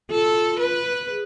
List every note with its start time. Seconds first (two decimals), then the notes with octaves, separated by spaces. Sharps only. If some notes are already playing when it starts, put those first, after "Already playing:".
0.11 F4 A4
0.59 B4
1.08 G#4